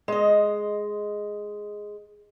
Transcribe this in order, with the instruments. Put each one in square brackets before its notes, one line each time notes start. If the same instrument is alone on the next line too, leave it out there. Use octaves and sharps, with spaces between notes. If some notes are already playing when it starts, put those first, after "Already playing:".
[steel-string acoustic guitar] G#3 D#5